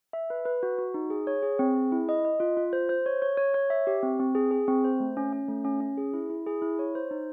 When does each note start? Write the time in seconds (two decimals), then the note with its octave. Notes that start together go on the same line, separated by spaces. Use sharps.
0.13 E5
0.30 B4
0.45 B4
0.63 F#4
0.78 F#4
0.94 D#4
1.10 G#4
1.27 C#5
1.43 G#4
1.59 C4
1.75 G#4
1.92 E4
2.09 D#5
2.25 D#5
2.40 F4
2.57 F4
2.73 C5
2.89 C5
3.06 C#5
3.22 C#5
3.38 C#5
3.54 C#5
3.70 E5
3.87 G4
4.03 C4
4.20 C4
4.35 G#4
4.51 G#4
4.68 C4
4.84 C5
5.00 A3
5.17 C#4
5.33 C#4
5.48 A3
5.64 C#4
5.81 C#4
5.98 G#4
6.13 E4
6.30 E4
6.47 G#4
6.62 E4
6.79 C#5
6.95 C5
7.11 D#4